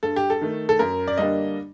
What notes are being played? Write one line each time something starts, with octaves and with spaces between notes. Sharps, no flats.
G2 A4
G4
A4
D#3 A3
A4
F#2 A#4
D5
D3 G3 A#3 D4 D#5